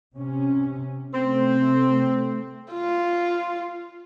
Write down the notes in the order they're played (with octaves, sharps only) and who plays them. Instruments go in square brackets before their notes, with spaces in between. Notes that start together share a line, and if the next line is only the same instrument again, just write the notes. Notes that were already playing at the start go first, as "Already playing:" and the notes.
[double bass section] C3 C#4
[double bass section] C3 A3 [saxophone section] C4
[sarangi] F4